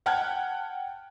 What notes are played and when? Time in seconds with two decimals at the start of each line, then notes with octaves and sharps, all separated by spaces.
0.06 F#5 G5 A5 F6 F#6 G#6